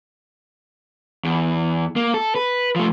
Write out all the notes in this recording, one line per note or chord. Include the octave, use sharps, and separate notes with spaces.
E2
A#3
A4
B4
F3 A3